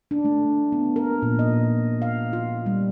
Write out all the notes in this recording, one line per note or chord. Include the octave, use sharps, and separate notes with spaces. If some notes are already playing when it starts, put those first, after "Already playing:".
D4
A3
B3
A#4
A#2
D#5
F5
F4
G3